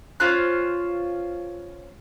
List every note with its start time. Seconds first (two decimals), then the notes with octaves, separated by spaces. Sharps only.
0.20 C#4 F4 C5 F#6